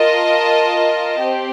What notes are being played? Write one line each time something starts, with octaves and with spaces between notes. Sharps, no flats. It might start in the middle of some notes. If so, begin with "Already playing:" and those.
Already playing: F4 A#4 D#5 A5
C4 G4